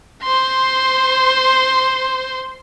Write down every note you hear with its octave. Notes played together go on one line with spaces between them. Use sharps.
C5 C6